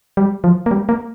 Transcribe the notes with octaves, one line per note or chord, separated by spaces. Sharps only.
G3
F3
A#3
G3
A#3